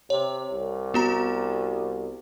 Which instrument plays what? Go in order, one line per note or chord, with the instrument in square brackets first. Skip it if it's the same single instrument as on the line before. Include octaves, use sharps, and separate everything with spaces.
[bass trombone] C3 [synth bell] C#5
[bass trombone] C2
[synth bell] B3 F#4 A#5